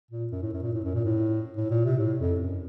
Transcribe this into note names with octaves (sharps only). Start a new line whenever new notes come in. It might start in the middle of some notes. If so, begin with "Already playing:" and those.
A#2
F#2
A2
F#2
A#2
A2
F#2
A#2
A2
A2
A#2
C3
A2
F2
F#2